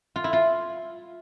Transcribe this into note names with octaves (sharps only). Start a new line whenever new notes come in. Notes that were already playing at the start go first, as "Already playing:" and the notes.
F4
E4
F4